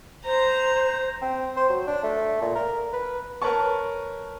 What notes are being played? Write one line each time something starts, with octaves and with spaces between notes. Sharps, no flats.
C5 A#5
C4
C5
F#3
D4
A3
A#2
A#4
B4
A#4 B4 C#5 A5 C#6